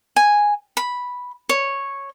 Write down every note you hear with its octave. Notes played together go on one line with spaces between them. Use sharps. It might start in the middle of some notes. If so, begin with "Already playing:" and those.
G#5
B5
C#5